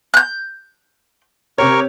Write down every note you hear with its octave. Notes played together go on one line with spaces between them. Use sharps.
F#6 G6
C3 G4 A#4 C#5 C#6